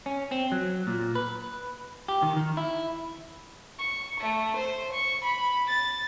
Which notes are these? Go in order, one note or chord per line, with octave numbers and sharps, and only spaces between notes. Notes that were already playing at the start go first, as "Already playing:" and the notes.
C#4
C4
F#3
A#2
B4
G4
D#3
D#3
E4
C#6
A3
C5
C#6
B5
A6